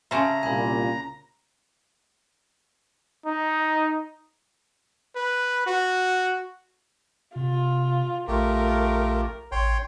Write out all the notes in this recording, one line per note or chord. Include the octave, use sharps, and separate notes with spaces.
C#3 C#4 C5 E5 A5 A#5
C2 A#2 G#5 B5
D#4
B4
F#4
C3 F4
A#1 A3 F4 G4 A#4
A1 C#5 G5 C6